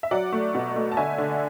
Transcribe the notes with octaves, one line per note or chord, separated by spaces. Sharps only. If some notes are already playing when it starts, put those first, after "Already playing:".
E5
F#3 D5 F#5
A3
B2
A3
A5
D3 E5 G#5
D3